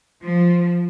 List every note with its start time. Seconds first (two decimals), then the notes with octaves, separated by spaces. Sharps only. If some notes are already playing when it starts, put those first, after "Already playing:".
0.22 F3